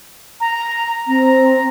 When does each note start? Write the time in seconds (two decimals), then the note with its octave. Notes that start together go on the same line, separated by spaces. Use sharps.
0.40 A#5
1.08 C4 A#5